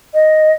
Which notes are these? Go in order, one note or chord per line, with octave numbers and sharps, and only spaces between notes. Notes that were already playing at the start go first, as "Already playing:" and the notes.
D#5